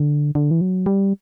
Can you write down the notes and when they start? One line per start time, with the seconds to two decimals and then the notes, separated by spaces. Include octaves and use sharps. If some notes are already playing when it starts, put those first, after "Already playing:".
Already playing: D3
0.35 D3
0.51 E3
0.61 F#3
0.86 G3